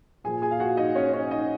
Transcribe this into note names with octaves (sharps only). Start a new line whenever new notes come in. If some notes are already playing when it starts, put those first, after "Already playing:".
A#2 F3 G#4 G#5
G#4 G#5
F5
F#4 F#5
D#4 D#5
C#4 C#5
C#4 C#5
D#4 D#5